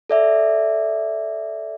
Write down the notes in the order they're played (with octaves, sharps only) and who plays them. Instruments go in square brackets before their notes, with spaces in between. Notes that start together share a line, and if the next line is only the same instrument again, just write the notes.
[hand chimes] A4 D5 E5